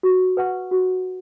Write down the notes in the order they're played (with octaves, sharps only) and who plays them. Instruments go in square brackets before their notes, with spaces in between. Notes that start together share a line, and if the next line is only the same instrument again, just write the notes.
[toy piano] F#4
B4 F#5 C#6
F#4